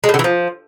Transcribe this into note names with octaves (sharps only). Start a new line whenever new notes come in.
G#3
A2
D3
E3
F3